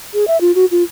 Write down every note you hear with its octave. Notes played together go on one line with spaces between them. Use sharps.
G#4
E5
F4
F#4
F4